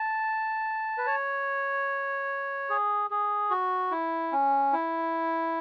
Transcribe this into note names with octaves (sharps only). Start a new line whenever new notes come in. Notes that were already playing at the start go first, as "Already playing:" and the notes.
Already playing: A5
B4
C#5
G#4
G#4
F#4
E4
C#4
E4